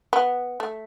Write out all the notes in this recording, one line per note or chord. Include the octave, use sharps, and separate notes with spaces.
B3
A3